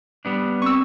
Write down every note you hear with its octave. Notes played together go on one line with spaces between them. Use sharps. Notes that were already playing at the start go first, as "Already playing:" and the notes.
G3 B3 D4
C4 C#6 E6